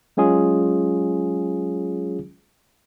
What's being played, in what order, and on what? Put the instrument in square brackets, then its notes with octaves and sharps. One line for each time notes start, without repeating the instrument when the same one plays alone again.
[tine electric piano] F#3 G#3 C#4 F4 G#4